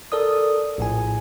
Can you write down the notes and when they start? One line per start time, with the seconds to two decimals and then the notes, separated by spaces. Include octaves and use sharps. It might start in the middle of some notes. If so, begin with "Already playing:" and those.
0.12 A4 A#4 D5 D#6
0.78 A#1 A2 G#5